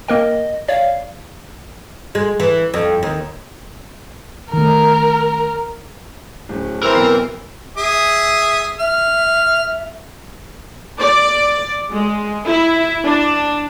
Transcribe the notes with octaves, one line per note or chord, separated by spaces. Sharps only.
A#3 A#4 D#5 G5
C#5 D5 F5
G#3
E3
F2
D#2
D#3 A3 A#4
D1 C#4
E3 C4 A#4 A#5 E6
B1 C7
G#4 E5 D#6
E5 F6
D5
G#3
E4
D4